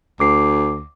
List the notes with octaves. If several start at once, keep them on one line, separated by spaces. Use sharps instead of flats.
D2 D6 C7